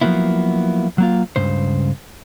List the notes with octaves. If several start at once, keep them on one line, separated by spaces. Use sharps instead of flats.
F3 F#3 A#3 B3 E4
F#3 A#3 F4
C#2 G2 C#3 C5